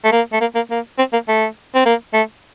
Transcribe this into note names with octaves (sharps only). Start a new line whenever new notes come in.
A3
A#3
A3
A#3
A#3
A#3
C4
A#3
A3
C4
A#3
A3